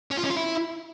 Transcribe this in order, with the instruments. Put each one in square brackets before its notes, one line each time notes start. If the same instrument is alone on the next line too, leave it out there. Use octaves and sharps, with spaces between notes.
[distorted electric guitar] C#4
F4
C#4
F4
E4